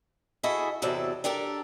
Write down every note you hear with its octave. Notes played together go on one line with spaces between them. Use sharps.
E4 F#4 G#4 A4 D#5 E5
E2 C3 F#3 A4 D5
D4 G4 A4 A#4